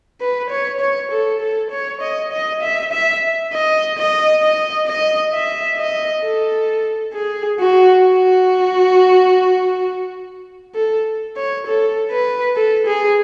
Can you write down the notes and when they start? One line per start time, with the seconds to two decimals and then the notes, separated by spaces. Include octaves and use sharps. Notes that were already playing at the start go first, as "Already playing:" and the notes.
0.21 B4
0.50 C#5
0.80 C#5
1.11 A4
1.40 A4
1.71 C#5
2.01 D#5
2.32 D#5
2.62 E5
2.92 E5
3.53 D#5
3.98 D#5
4.42 D#5
4.87 D#5
5.33 E5
5.78 D#5
6.23 A4
7.13 G#4
7.60 F#4
8.04 F#4
10.75 A4
11.36 C#5
11.67 A4
12.11 B4
12.56 A4
12.87 G#4